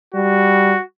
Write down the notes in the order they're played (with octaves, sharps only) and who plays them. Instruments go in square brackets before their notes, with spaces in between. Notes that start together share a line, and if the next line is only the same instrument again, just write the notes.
[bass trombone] G3 [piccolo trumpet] F#4